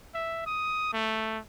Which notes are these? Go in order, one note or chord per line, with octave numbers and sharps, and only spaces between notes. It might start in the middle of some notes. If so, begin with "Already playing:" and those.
E5
D#6
A3